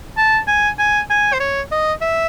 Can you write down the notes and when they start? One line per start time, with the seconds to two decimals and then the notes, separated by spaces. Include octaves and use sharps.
0.17 A5
0.48 G#5
0.79 G#5
1.10 G#5
1.33 C5
1.40 C#5
1.71 D#5
2.01 E5